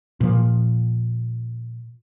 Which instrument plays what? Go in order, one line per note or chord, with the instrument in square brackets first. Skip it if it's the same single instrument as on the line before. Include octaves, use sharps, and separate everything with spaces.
[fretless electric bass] A#2 F3